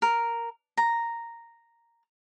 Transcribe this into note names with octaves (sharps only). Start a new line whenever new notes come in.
A#4
A#5